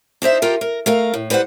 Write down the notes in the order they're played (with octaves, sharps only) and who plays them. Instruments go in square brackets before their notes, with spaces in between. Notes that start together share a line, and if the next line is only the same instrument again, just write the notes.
[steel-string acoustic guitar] D4 D#4 C5 E5
F4 G4 A4 A#4
A#4
A3 A#4 F5
A2
G3 B4 C5 F5 F#5